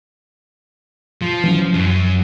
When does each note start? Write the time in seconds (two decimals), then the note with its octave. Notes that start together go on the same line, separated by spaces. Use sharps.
1.22 F3
1.44 E3 F#3 C#4
1.74 F#2